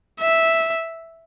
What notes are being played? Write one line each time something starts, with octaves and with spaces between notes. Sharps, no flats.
E5